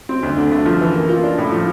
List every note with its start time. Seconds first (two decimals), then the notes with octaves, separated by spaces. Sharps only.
0.09 C4
0.23 D2
0.37 D3
0.52 A3
0.65 F3
0.81 E3
0.94 A#3
1.09 F4
1.23 D4
1.38 A2
1.52 F3